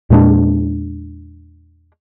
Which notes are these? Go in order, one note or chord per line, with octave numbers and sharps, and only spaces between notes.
E2 A#2 G#3 D4